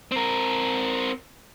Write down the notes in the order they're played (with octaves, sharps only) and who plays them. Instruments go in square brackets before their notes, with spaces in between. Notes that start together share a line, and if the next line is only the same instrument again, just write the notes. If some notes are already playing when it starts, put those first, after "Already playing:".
[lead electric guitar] C4 A#4